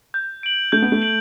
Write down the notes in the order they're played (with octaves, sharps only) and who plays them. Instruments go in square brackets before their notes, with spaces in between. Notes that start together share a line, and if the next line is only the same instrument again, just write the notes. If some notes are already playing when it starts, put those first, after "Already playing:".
[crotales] G6
D7 F#7
[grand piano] A3 [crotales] G6
[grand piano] B3
A3
[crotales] D7 F#7